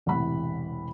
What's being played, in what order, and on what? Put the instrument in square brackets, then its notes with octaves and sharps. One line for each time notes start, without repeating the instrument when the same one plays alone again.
[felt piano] E1 A1 C3 E3 F#5 B5